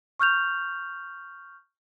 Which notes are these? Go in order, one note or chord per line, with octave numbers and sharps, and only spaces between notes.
C#6 F6 G6 F7